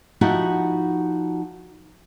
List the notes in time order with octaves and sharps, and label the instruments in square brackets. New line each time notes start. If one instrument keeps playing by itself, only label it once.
[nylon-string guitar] F3 B3 D#4 E4 F#4 G4